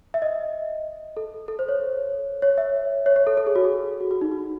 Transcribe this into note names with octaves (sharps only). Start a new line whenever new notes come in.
E5
D#5
A4
A4
C5
C#5
C#5
E5
C#5
C#5
A4
A4
G#4
F#4
G#4
F#4
F#4
D#4
F#4